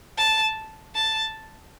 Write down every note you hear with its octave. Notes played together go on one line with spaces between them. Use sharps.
A5
A5